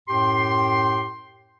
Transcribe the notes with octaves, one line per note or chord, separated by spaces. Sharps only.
F#2 A2 G4 G5 C6